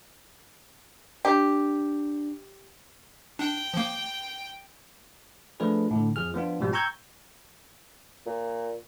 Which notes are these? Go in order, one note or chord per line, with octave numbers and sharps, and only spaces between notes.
D4 G4
D4 G5
F3 A#3
F3 A3 D4 G#4 B4
A2 D3
F2 F3 G#4 F6
F3 B3 D4 F4
G#2 B2 F3 G3
G5 A#5 C#6 E6 G6 G#6
A#2